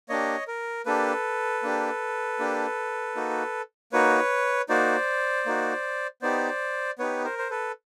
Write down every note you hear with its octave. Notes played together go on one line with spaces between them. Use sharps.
A#3 D4 G4 C#5 D#5
A#4
A#3 D4 G4 A4 B4
A#3 D4 G4
A#3 D4 G4
A#3 D#4 F#4
A#3 D#4 F#4 B4 C#5
A#3 D#4 F#4 C5 D5
A#3 D#4 F#4
B3 D#4 G4 C5 D5
B3 D#4 G4 B4 C#5
A#4 C5
C5
A4 B4